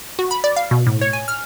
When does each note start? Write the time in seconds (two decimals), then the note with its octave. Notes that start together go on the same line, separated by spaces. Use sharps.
0.19 F#4
0.31 B5
0.44 D5
0.56 F5
0.71 B2
0.87 A2
1.01 C#5
1.13 G#5
1.28 F6